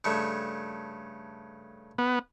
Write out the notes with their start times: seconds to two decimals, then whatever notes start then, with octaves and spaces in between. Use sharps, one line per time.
0.04 G2 C#3 A3
1.98 B3